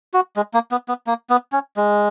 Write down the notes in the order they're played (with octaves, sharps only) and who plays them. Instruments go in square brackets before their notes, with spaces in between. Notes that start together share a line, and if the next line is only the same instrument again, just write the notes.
[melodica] F#4
G#3
A#3
B3
B3
A#3
B3
C#4
G#3